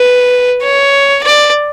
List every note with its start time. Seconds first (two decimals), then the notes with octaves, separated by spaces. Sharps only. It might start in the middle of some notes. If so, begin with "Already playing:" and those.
Already playing: B4
0.63 C#5
1.24 D5